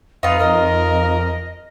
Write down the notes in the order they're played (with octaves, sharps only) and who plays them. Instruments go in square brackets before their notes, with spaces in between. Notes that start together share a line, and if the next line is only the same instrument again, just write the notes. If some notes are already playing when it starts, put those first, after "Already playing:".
[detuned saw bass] F2 [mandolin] D#4 F4 [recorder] B4
[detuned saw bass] F2 [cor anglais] A#4 [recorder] D#5